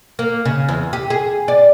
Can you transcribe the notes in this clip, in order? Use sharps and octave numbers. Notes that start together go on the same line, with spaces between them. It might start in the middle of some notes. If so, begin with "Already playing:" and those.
A#3
C#3
E2
G4
G#4
D5